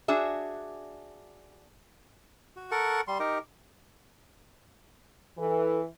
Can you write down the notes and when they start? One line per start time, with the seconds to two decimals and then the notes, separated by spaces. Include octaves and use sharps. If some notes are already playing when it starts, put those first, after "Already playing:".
0.08 D4 F#4 G#4 E5
2.56 F#4
2.71 A4 A#4 F#5 C#6
3.08 G3 C6
3.20 D#4 G4 A#4
5.38 E3 A4